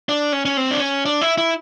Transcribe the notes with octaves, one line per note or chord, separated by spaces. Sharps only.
D4
C#4
C#4
C4
D4
C#4
D4
E4
E4